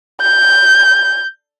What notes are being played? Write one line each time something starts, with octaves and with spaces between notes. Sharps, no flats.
G6